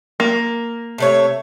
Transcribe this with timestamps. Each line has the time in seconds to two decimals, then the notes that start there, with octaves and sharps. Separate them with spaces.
0.20 A#3
0.98 C3 A3 C#5